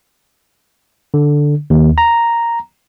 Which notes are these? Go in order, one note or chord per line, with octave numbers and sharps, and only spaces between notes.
D3
D#2
A#5